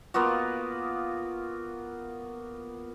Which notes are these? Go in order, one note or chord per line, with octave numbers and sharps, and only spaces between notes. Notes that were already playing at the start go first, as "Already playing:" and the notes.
A#3 B3 F4 F#4